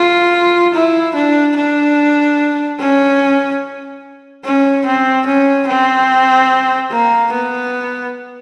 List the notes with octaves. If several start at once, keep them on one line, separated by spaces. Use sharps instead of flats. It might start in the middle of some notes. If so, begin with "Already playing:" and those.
Already playing: F4
E4
D4
D4
C#4
C#4
C4
C#4
C4
A#3
B3